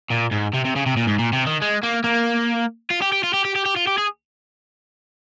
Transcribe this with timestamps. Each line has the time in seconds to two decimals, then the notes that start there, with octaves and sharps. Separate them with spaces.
0.11 A#2
0.32 G#2
0.54 C3
0.65 C3
0.76 C#3
0.86 C3
0.97 A#2
1.07 G#2
1.19 A#2
1.33 C3
1.47 D#3
1.62 G#3
1.83 A#3
2.04 A#3
2.91 F4
3.02 G4
3.12 G4
3.24 F4
3.34 G4
3.45 G4
3.55 G4
3.65 G4
3.76 F4
3.87 G4
3.98 G#4